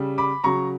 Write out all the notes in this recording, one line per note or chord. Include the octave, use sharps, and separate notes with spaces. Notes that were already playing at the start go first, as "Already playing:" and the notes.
Already playing: C#3 G3
B5 D6
C#3 F#3 A#5 C#6